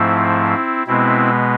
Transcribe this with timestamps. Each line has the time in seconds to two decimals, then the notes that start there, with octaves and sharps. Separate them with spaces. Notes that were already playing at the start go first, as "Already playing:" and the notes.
Already playing: G#2 F3 A3 C4 E4
0.87 B2 G#3 B3 C4 E4